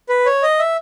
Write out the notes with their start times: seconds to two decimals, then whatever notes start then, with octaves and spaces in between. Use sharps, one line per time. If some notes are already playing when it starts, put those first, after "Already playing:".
0.09 B4
0.26 C#5
0.43 D#5
0.59 E5